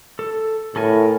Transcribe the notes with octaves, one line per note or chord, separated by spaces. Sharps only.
A4
A2 A4 A#4 G#5